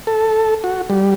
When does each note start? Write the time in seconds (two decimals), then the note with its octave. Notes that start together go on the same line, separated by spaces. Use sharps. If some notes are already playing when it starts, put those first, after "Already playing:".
0.07 A4
0.64 F#4
0.90 G3